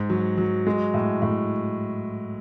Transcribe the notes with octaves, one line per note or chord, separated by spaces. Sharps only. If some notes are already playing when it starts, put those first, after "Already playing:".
Already playing: G#2
F#3
F#3
G#3
A2
A2